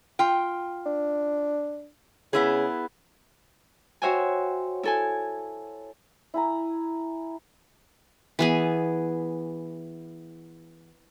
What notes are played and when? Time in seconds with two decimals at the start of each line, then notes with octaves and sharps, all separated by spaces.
0.19 F4 G5
0.86 D4
2.33 C#3 B3 E4 G#4
4.02 F#4 C5 C#5 E5 G5 G#5
4.83 E4 A4 G#5
6.34 E4 G#5 A#5
8.39 E3 B3 G#4